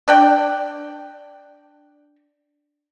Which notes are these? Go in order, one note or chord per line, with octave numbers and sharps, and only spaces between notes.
D4 D5 G5